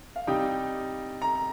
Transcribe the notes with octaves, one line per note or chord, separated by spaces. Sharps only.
F5
C3 G3 D#4 G5
A#5